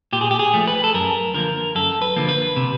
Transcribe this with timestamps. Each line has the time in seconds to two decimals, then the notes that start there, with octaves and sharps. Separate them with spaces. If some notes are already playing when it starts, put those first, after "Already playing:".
0.13 A#2 G4
0.21 G#4
0.31 G4
0.39 G#4
0.54 F3 A3
0.67 B4
0.84 A4
0.94 F#2 A#4
1.34 D3 F3 A#3 A#4
1.75 F#2 A4
2.02 B4
2.16 D3 F3 A#3
2.29 B4
2.56 C3